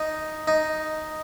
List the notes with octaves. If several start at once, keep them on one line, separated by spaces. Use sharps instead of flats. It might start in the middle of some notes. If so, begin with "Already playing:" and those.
Already playing: D#4
D#4